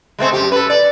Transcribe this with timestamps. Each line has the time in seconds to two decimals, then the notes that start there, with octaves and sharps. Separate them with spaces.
0.19 G#3 A3 C4
0.33 F#2 G4
0.52 A4 B4
0.70 D5